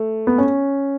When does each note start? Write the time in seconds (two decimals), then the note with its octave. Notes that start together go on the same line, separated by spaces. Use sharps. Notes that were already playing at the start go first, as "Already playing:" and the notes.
Already playing: A3
0.27 B3
0.38 C#4